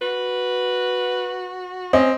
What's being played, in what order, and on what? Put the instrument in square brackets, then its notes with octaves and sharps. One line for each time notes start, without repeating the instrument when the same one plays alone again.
[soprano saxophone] F#4 [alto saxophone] B4
[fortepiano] C4 [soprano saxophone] C#4 [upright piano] D#5